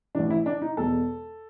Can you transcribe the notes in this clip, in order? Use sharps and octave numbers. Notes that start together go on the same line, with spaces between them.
A1 G#2 E3 D4
E4
D4
D#4
E2 B2 G#3 A4